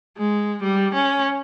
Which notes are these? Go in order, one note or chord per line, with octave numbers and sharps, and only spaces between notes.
G#3
G3
C#4